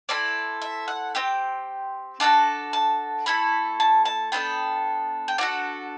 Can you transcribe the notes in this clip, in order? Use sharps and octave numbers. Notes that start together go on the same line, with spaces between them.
C4 E4 A4 D5
E5
F#5
C4 G4 G5
D4 F#4 A4 A5
A5
A3 E4 A4 B5
A5
A5
B3 D4 A4 G5
G5
D4 F#4 A4 F#5